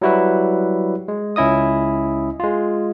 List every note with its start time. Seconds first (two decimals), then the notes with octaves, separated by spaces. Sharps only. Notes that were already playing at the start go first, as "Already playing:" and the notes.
0.02 F#3 G3 E4 F#4 B4
1.08 G#3
1.36 C#2 C#4 E4 D#5 D#6
2.40 G#3 F4